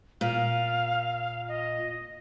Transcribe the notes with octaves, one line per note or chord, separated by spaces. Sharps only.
A#2 F5
D#5